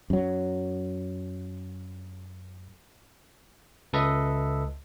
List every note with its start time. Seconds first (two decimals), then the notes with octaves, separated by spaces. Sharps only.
0.10 F#2 F#3
3.93 C#2 A4 B4 D#5 E5